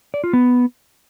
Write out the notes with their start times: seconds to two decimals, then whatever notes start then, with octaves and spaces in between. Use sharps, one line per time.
0.14 D5
0.24 F4
0.33 B3